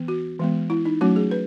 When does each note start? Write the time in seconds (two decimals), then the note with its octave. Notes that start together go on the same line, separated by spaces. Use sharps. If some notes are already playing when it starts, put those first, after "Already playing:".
Already playing: E3 B3
0.08 F#4
0.39 E3 G#3 B3
0.70 E4
0.85 D#4
1.01 F#3 A3 C#4 F#4
1.16 G#4
1.31 B4